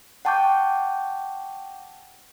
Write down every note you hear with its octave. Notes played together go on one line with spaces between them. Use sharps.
F#5 G5 A5 C#6 D6 G6